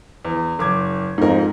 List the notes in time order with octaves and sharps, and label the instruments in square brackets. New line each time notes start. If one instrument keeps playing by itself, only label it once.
[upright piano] E2
F#1 D6 G#6
[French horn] F2 [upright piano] G#2 A#4